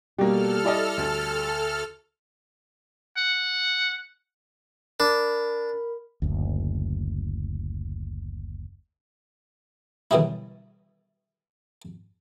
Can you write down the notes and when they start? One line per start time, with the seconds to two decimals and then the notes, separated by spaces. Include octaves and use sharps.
0.18 B2 G3 A#3 G4 A4 F6
0.64 E4 D5 D#5
0.97 D2
3.17 F#5
5.00 D4 A#4 B5
6.22 F#1 D2
10.11 B2 D3 E3 F#3 G3 E4